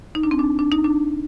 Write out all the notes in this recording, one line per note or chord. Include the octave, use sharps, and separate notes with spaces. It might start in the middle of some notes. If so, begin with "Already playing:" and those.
D#4
D4
C4
D4
D4
D#4
D4